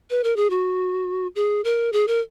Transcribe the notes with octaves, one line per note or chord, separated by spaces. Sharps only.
B4
A#4
G#4
F#4
G#4
A#4
G#4
A#4